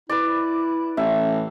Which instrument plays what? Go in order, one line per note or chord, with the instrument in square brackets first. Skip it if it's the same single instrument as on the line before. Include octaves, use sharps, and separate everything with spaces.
[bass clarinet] E4 [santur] B4 D5
[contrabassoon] A1 [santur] E5